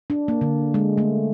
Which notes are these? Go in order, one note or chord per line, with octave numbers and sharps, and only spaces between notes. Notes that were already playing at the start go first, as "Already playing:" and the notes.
D4
A#3
D3
G#3
A3